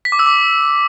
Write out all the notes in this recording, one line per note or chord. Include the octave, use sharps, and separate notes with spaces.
B6
D6
E6
D6